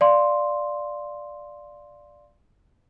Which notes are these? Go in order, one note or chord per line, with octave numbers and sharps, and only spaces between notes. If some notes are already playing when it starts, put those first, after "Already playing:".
D5 F5 C6